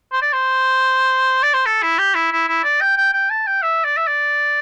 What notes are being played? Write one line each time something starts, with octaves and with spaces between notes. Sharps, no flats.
C5
D5
C5
D5
C5
A4
E4
G4
E4
E4
E4
D5
G5
G5
G5
A5
G5
E5
D5
E5
D5